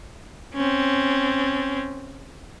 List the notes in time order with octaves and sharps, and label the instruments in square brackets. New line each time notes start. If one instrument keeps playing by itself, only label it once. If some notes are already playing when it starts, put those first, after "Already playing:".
[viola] C4 C#4